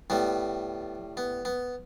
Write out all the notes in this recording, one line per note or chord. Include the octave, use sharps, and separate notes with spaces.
A2 G3 B3
B3
B3